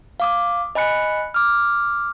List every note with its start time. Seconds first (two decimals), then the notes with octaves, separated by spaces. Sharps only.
0.20 F5 D6 D#6
0.75 D#5 G#5 B5 F#6 C#7
1.34 D6 F6